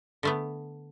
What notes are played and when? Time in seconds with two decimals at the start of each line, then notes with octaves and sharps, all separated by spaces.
0.23 D3 A3 B3